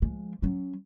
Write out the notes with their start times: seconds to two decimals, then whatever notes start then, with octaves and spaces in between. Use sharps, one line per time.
0.02 F3 G#3
0.42 F#3 C#4